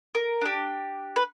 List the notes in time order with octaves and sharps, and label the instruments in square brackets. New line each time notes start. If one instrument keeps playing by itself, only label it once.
[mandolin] A#4
D4 G4
B4